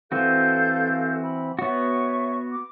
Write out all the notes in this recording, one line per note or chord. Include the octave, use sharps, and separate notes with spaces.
E3 C4 F#4 A4 F5 G6
B5
B3 F#4 C#5 E5 C#6
D6